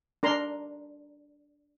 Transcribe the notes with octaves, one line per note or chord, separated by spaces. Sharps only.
D4 A#4 A#5 C6